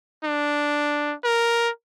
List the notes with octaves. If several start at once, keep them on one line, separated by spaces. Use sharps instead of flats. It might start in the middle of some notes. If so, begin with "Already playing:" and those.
D4
A#4